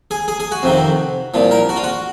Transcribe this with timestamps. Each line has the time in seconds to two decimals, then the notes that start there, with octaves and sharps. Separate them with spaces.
0.11 G#4
0.28 G#4
0.40 G#4
0.52 F#4
0.63 F2 C3 D#3
1.34 C2 A#2 F3
1.51 A#4
1.69 F#4
1.76 F4
1.84 F#4